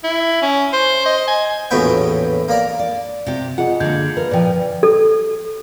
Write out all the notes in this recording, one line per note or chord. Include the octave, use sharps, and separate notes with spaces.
E4
C#4
C5
D#5
G#5
A#1 E2 A2 F#3 B3 G5
A#3 D5 A#5
D5
C3 G4
F4 G#4 D#5 F#5
D3 A#3 G6 G#6
A#4 B4
A#2 F3 D5 G5 G#5
A4